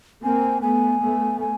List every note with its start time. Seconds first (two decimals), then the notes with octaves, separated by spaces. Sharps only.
0.23 A#3 C4 G#5
0.62 A3 B3 G#5
1.01 A3 B3
1.40 G#5